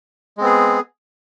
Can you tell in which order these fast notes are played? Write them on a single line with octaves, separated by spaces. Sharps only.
G#3 C4 B3 G#4